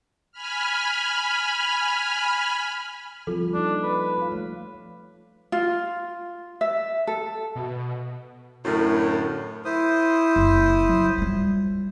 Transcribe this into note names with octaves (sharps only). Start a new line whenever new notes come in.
G#5 B5 F6
F3 G3 C4 F4 A4
A#3 D4 D#4
B4
F4 F5
A3 C#5
F4
E5
A4
B2
F#2 A2 D3 E4 A#4
E4 C5 D#6
F#1
F#3
G3 F4